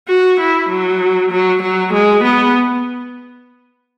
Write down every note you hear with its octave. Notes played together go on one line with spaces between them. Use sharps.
F#4
E4
F#3
F#3
F#3
G#3
B3